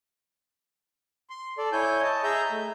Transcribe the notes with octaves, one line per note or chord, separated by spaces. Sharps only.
C6
A4 D5
E4 C#5 G#5 G6
D#5 A5
G#4 E5 A#5 G6
A3